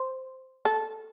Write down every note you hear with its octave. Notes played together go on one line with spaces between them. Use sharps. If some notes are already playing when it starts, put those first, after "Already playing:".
Already playing: C5
A4